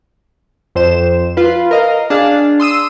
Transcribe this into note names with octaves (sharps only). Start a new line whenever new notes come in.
F2 C5 E7
F4 B4
A#4 D#5 F5
D4 G#4 F5
C6 D#6 E6 D#7